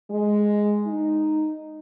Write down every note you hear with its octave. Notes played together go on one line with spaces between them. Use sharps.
G#3
D#4